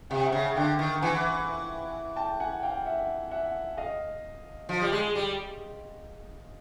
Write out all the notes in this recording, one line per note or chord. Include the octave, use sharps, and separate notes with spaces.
C3 F#5
G5
E5 F#5
C#3
D3 F5 G5
D#3
E3 F#5 G#5
G5 A5
F#5 G#5
F5 G5
E5 F#5
E5 F#5
D#5 F5
F3
G3
G#3
G3